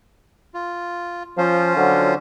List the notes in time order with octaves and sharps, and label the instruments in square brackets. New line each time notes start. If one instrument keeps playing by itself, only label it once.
[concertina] F4
[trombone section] F3 [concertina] C#4 F4 C5
[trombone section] D3 F#3